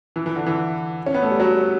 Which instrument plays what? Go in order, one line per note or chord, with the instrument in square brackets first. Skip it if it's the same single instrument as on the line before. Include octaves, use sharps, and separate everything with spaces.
[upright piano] E3
E3
D3
E3
C#4
B3
A3
G3
F#3